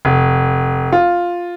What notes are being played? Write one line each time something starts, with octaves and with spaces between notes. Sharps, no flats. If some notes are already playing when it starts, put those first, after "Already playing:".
F1
F4